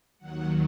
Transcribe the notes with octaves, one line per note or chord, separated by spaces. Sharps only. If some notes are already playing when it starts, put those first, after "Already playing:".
D#2 D#3 F#3 F#5